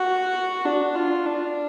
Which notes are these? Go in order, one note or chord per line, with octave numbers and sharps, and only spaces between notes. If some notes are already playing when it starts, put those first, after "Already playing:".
Already playing: F#4
D4
F4
D4